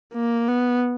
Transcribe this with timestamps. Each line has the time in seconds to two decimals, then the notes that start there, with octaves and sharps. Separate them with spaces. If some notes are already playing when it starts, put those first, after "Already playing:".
0.14 A#3
0.48 B3